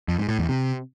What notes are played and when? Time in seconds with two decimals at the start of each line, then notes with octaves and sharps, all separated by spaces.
0.08 F2
0.18 G#2
0.29 A2
0.39 E2
0.49 C3